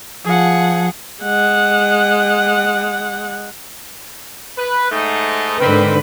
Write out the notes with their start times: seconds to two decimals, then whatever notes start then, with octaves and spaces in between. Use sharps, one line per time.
0.25 F3 G#4 F#5
1.23 G#3 F#5
4.57 B4
4.90 G#2 A3 D#4
5.59 G#2 D3 D#3 C4 B4